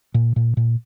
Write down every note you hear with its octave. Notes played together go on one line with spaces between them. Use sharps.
A#2
A#2
A#2